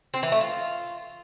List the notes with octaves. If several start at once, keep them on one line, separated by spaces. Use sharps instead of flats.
C4
E3
A3
F4